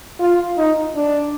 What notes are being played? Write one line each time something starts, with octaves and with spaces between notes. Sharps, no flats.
F4
D#4
D4